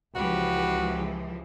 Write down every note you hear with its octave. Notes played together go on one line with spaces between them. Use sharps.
C#2 E3 F3 F#4 G4 B4